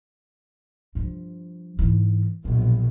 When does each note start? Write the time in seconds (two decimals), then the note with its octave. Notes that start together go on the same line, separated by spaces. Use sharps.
0.95 G2 F3
1.79 G#2 E3
2.45 A#1 B2 F#3